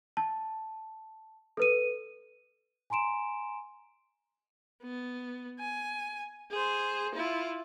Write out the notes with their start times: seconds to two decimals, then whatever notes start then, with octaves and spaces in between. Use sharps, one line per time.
0.17 A5
1.57 A4 B4 D#7
2.90 G#5 A#5 C6 D7 E7
4.83 B3
5.60 G#5
6.51 G#4 C5
7.15 E4 F4